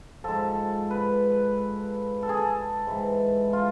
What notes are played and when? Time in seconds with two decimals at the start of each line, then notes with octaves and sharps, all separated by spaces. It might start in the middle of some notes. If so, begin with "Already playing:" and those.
0.24 G#2 F3 A4
0.91 B4
2.23 A4
2.29 G#4
2.37 A4
2.87 G#2 E3
3.53 F4